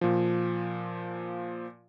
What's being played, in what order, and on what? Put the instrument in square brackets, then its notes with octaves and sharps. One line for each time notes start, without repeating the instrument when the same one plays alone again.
[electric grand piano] A#2 F3